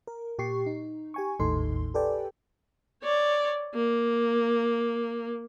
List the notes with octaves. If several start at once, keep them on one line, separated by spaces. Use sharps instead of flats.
A#4
A#2 G4 C#6 C7
D#4
G4 G#5 C#6
G#1 D#2 A2 D#4 A4 C6
G4 A4 B4 D5 G5 G#5
C#5 D5
A#3